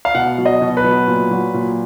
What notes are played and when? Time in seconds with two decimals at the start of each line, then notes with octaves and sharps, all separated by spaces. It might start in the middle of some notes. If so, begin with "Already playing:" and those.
0.05 F5
0.15 B2 F#5
0.38 F#3
0.46 D#5
0.61 B2
0.77 B4
0.84 F#3
1.08 A#2
1.31 F#3
1.54 A#2